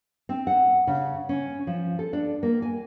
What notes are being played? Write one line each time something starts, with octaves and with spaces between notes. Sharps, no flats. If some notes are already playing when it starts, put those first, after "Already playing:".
C4
F#5
C#3
C#4
F3
A4
D4
A#3
G#5